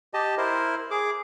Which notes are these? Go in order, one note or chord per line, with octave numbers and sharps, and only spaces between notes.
G4 D#5 A5
E4 A#4 C5
G#4 D6